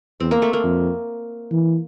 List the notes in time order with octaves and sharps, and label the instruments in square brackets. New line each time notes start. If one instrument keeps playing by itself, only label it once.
[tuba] E2 [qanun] C4
[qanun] A#3
A3
A#3
[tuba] F2
E3